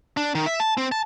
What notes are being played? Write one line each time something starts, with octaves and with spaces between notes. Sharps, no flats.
D4
D#3
E5
A5
C4
A5